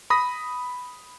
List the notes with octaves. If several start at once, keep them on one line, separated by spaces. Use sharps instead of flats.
B5 D#6 A#6